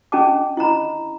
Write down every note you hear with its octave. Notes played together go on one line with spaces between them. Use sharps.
C#4 D4 G#4 D#5 A5 D6
E4 D#5 A#5 B5